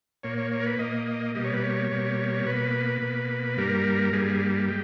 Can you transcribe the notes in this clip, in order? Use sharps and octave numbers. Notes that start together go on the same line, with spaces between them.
A#2 A#3 C#5
C#5
C#5
A#4
B4
A#2 A#3 D#5
D#5
B2 G3 A#3 D#5
C#5
B4
C#5
B2 G3 A#3
B2 A#3 B4
B2 A#3
G2 G3 A#3 A#4
G2 G3 A#3 G#4
G#3 G4